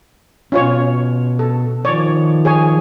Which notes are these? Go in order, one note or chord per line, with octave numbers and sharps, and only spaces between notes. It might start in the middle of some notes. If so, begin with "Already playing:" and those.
B2 C#4 F4 C#5
A4
D#3 F3 C#5 D5
G#4 C#5 G#5